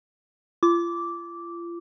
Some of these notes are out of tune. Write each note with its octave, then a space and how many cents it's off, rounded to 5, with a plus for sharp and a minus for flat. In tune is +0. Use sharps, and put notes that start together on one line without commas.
F4 -35 D6 -10